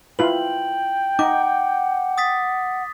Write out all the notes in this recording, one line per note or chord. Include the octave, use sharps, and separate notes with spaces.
E4 F4 B4 G5 F#7
D#4 F#5 D6
D#6 A6 B6